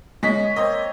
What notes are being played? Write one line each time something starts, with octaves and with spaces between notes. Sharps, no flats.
G#3 C#5 D#5 B6
A#3 C4 C#5 D#5